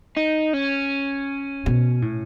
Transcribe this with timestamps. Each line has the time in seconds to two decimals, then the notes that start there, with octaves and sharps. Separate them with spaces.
0.17 D#4
0.54 C#4
1.66 B2
2.02 A2